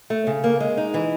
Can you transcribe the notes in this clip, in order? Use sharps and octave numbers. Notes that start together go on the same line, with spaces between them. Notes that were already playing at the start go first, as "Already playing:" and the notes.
A3
C#3
A#3
G#3
D#4
E3